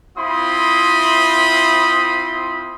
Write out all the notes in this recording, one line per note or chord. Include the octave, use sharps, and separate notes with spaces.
C4 E4 F4 B5 C6 D#6